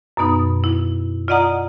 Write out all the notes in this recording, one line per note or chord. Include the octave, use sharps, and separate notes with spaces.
F#2 B2 B3 D#4
E4
F4 D5 D#5 F#5 A#5 D#6